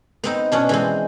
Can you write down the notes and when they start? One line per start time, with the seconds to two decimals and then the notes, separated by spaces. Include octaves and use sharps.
0.24 B3 C4 D#4
0.52 B2 C#4 D4
0.69 E3 G#3 C4